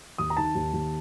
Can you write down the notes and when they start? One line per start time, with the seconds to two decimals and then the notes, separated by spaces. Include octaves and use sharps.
0.18 D#2 D#6
0.30 A#5
0.37 D#3 A5
0.55 D#2
0.74 D#2